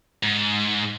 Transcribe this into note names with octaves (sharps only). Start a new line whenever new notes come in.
G#2